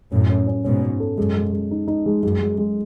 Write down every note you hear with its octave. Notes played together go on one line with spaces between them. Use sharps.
F#2 A2 C#4
C#4
C#4
G#2 B2 C#4
C#4
A4
F#2 G#3
G#3
G#3
D#4
D#4
G#3
F#2 G#3
G#3
G#3